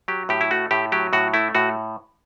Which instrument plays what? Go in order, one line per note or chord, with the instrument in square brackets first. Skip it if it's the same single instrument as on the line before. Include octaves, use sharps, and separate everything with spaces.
[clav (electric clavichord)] F#3 G4
A2 G4
E4
A3 F#4
A2 G4
F#3 G4
A2 F#4
A3 E4
A2 F#4